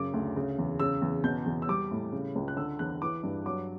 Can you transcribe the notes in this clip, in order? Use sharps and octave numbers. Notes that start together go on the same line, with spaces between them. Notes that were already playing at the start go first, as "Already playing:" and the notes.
Already playing: F#2 C#3 D6
D2
C#3
E2
C#3 E6
E2
B2 G6
E2
E6
G3 D6
A2
C#3
C#2
F#6
D3 E6
E2 F#6
E3 D6
G2
F#3 D6